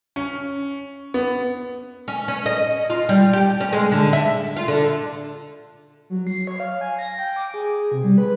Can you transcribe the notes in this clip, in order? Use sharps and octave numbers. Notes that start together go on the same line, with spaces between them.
C#4
B3
C#4
C#4
D#5
F4
G3
G4
C#4
G#3
D3
E5
F4
D3
F#3
C7
C#5
F5
G#5
A#6
G5
D6
G#4
C3
G3
B4